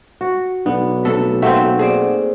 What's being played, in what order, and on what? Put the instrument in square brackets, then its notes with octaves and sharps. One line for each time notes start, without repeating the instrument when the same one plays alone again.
[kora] F#4
[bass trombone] B1 [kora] B3 [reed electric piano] D4
[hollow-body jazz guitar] C3 A3 [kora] A4
[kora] A3 A#3 C4 [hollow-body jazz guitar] E5 [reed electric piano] F#5
[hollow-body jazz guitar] G#4 C5 D5